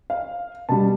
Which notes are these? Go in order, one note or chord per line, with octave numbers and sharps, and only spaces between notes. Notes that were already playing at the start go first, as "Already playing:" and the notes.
F5
B2 G3 A5